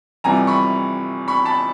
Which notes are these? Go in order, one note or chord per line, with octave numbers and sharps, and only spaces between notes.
F2 C3 E3 G3 G#5 A#5
B5 C#6
B5 C#6
A5 B5